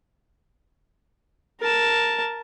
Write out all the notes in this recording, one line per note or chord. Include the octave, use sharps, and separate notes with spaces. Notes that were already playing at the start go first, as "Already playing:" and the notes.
A#4 A5